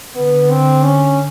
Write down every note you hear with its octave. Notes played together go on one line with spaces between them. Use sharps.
D3 B3
C4
C#4